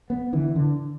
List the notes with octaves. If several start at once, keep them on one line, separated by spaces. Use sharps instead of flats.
B3
D3 E3
D3